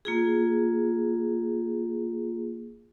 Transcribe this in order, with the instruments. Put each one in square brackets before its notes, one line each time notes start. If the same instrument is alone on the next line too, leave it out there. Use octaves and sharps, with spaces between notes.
[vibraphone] A#3 F4 G#4